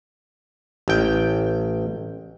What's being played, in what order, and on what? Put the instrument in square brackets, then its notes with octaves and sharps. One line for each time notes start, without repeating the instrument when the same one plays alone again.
[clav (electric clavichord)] A1 G5